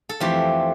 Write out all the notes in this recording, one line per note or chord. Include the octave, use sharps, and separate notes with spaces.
A4
F2 E3 A3 C4 G4